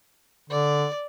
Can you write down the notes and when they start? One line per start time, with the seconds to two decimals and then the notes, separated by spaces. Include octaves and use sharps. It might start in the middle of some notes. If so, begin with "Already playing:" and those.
0.50 D3 D5